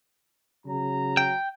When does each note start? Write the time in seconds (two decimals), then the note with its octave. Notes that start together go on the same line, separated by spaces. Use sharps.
0.66 C#3 F#3 A#5
1.17 G5